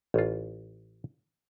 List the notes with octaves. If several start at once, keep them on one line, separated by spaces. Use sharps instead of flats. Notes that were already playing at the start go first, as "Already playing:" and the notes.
A1 F4